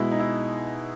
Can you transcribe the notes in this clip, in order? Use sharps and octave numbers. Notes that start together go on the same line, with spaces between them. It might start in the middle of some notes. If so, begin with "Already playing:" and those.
Already playing: B2 G#3 E4
D#4
E4